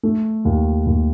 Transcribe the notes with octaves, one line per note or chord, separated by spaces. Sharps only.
A3
D#2
D#2